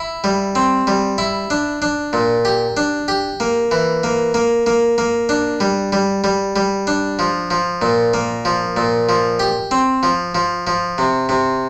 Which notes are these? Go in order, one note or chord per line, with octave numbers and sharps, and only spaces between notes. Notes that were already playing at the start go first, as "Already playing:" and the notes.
Already playing: E4
G3
C4
G3
E4
D4
D4
A#2
G4
D4
G4
A#3
E3
A#3
A#3
A#3
A#3
D4
G3
G3
G3
G3
D4
F3
F3
A#2
A#3
F3
A#2
F3
G4
C4
F3
F3
F3
C3
C3